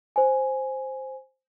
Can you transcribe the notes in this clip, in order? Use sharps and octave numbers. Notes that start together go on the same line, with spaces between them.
C5 G#5